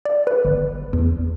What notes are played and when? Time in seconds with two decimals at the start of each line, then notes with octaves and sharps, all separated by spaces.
0.05 D5
0.27 B4
0.45 G1
0.93 E2